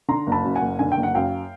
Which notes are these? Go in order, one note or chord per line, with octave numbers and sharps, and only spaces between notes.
D3 A#5 C6
F#1
A5 B5
F#2
F#5 G#5
F#1
D3 G#5
G5
F#1
F#5
F#2 F5 G5